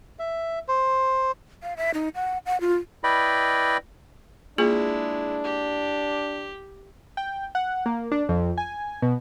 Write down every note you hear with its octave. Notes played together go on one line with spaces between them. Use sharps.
E5
C5
F5
E5
D#4
F#5
F#5
F4
E4 B4 D5 D#5 G5 B5
G#3 A#3 D4 E4 F4 G#4
G4
G5
F#5
A#3
D4
F2
G#5
B2